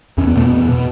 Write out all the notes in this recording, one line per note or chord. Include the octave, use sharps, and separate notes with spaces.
E2 C#4
B3
B2 A3
B3
E2
B2